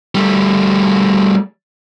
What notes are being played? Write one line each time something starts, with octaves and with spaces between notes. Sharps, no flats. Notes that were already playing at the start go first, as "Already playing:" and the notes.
G3 A3